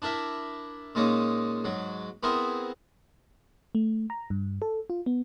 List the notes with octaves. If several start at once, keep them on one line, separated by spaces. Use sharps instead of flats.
D4 E4 A#4 E5
A#2 G#3 A#3 C#4 D#4
G#2 F#3
B3 C4 E4 G#4 A#4 C5
A3
A#5
G2
A4
F4
B3